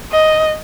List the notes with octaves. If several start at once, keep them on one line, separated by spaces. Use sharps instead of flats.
D#5